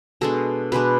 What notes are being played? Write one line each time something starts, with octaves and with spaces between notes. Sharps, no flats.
B2 G#3 D4 A4
B2 G#3 D4 B4